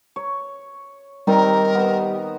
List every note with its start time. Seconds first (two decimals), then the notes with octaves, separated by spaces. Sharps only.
0.16 C#5
1.27 D#3 G3 C4 D#4 A#4
1.75 B3 B4 C5